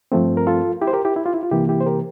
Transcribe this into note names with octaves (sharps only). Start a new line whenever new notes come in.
G2 F3 A3 C4
A#4
F4 A4
E4 G4
C5
G4 A#4
E4 G4
E4
F4
E4
F4
C3 E3 A#3 E4 G4
E4 G4
C5
G4 A#4